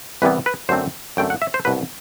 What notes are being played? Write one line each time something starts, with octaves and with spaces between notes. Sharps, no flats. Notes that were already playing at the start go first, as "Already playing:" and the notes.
C2 C3 E3 G3 B3 B4
B4
F#2 D3 A3 C4 C5
F#2 D3 A3 C4 G5
F#5
E5
C5
C2 B2 F#3 B4